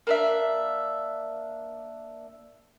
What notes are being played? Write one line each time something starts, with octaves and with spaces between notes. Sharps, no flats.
A#3 D4 E5